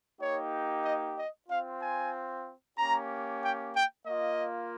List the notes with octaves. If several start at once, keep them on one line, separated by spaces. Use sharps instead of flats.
A#3 D#4 G4 C#5
D#5
D#5
C4 F4 F5
G#5
A#3 C#4 G4 A#5
G5
G5
A#3 F4 D#5